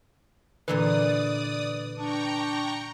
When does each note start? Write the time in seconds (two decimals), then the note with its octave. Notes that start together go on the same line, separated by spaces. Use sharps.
0.68 A#2 D3 E3 B4 D5 D#6
1.95 D4 G5 A#5 C#6